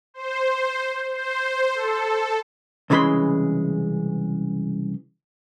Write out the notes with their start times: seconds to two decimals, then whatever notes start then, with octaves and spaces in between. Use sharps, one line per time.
0.14 C5
1.15 C5
1.75 A4
2.90 C2 C#3 E3 G#3 B5 C6